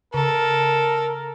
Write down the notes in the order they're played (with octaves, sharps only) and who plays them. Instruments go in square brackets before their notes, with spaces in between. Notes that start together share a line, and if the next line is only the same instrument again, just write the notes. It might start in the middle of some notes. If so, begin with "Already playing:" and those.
[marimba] C#3 [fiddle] A4 [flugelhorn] A#4